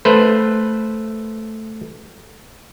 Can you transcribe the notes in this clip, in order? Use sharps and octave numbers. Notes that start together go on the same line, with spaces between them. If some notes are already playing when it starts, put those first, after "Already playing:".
A3 B4 C5